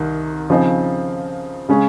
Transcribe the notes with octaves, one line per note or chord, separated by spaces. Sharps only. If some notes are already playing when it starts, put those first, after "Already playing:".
Already playing: C2 D#3
C#3 F3 C4 D#4
C#3 G#3 C#4 G#4